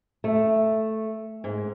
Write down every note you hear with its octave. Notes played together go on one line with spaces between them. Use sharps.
A3
G#2